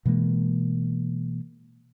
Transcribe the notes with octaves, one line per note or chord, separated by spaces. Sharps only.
B2 E3 G#3 A#3